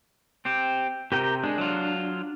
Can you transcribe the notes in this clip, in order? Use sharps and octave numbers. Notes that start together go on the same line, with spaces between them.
C4 G4
C3 G4 A#4 G5
G#3 D4
F#3 F4